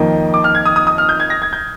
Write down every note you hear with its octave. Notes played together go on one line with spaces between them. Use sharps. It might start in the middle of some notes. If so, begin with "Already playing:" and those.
Already playing: F2 D#3 A#3 D#4
D6
F6
G#6
D#6
D#6
D#6
F6
G6
G#6
A#6
G#6
G6